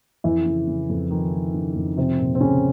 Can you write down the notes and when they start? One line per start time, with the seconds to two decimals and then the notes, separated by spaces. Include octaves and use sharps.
0.24 F2 E3 E4
0.46 C#3
0.68 C#3
0.89 F2
1.11 D#3 F3 D#4
1.32 F3
1.54 C#3
1.76 F2
1.97 C3 F3 C4
2.19 A#2
2.35 C4
2.41 A#2 C#3 C#4